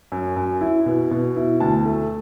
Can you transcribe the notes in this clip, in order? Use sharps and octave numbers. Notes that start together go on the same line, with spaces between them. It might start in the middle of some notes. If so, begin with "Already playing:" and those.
F#2
F#2
E4
B2
B2
E4
D2 A5
A3